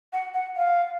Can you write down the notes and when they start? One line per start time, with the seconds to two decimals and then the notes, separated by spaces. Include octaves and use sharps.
0.13 F#5
0.34 F#5
0.56 F5